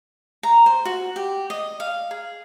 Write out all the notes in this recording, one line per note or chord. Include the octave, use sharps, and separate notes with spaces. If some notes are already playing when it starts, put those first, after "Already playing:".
A#5
C5
F#4
G4
D#5
F5
G#4